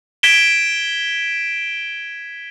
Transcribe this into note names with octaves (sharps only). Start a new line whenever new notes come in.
G#6 B6 D7 E7 G7